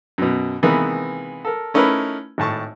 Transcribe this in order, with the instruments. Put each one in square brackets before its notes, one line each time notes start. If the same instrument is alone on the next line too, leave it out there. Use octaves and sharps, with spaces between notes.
[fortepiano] F#2 B2
C3 D#3 E3 G#3 A#3 B3
A4 A#4
A3 C#4 D#4 E4 A#4 B4
G#1 A2 A5 C#6